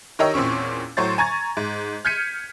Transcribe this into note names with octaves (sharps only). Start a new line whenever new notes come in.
D#3 G4 A#4 C#5 D#5 E6
E2 A#2 C4 C#4 C#6
A2 F#3 C5 C#6 A6
G#5 A#5 C#6 G#6 A6
G#2
F6 G6 G#6 B6 C#7 D#7